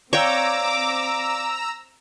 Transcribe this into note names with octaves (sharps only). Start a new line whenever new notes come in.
C4 C#5 D5 F5 G5 A#5 D6 E6